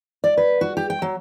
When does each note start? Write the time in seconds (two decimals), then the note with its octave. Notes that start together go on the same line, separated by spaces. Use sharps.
0.24 D5
0.37 B4
0.61 F#4
0.77 G4
0.90 G5
1.02 F#3